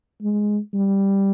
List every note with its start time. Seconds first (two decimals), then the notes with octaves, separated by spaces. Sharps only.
0.22 G#3
0.73 G3